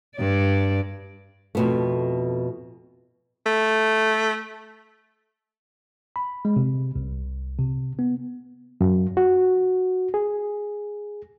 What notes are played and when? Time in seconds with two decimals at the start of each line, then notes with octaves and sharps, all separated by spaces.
0.17 G2 D5
1.55 F2 B2 A3
3.46 A3
6.16 B5
6.45 G#3
6.56 C3
6.96 C2
7.59 C3
7.99 B3
8.81 F#2
9.17 F#4
10.14 G#4